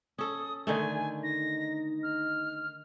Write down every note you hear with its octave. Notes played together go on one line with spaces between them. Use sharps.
C#4 A4 D#6
D3 D#3 A3 G#5
D#4 A#6
F6